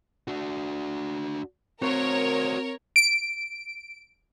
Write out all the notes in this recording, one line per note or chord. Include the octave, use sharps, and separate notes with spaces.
D4 F#4
C4 F#4 A#4 C5 C#5
D7